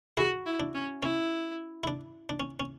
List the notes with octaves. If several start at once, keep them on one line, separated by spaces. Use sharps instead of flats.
E4 F#4 G#4
E4
D4
C#4
C#4 E4
E4
D4
D4
C#4
C#4